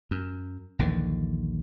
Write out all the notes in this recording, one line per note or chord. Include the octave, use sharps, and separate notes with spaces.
F#2
A#1 D#2 D3 E3